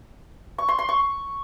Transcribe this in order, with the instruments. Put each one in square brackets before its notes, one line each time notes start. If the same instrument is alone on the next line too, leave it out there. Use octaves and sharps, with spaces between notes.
[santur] C#6
C6
C6
C#6